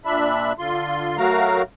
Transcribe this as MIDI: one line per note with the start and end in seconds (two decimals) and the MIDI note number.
0.05 0.52 46
0.05 0.52 62
0.05 0.52 76
0.05 0.52 83
0.59 1.17 50
0.59 1.17 65
0.59 1.17 84
1.18 1.62 54
1.18 1.62 57
1.18 1.62 66
1.18 1.62 70
1.18 1.62 77
1.18 1.62 82